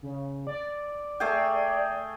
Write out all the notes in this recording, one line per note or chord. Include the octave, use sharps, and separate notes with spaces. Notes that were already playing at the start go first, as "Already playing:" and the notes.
C#3
D5
A3 G#4 G5